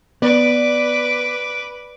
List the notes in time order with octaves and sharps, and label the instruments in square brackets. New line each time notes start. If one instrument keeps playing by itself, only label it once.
[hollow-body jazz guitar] B3 [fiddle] B4 D6 [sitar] D5